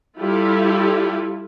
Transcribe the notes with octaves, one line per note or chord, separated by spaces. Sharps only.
G3 E4 F4 G4 A4